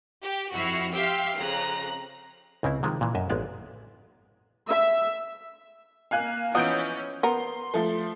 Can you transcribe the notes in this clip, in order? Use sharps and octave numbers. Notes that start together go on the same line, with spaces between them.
G4
F2 E4 F#4 F6 C7
G4 E5 F5 G5 C6
F2 C#3 A#5 F#6
C#2 C#3 C4 E4
C3 D#3 F3 G#3
A#2 E3
F#2 D#5 E5
A1 G#3 B3 D5 F5
E5
A#3 F5 G#5 F#6
E3 F3 B3 C#4 D#4 D#6 G6 D7
B3 A#4 C6
F3 A3